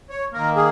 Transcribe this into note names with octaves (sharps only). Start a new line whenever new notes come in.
C#5
D#3 A#3 A#4
G#4